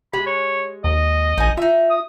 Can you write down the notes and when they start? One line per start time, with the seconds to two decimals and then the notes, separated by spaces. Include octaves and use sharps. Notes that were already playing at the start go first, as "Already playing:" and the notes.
0.13 G#3 G4 B5
0.27 C#5
0.84 D#2 D#5
1.37 A#1 D#4 G#5
1.57 D#4 F4 E5
1.90 D#6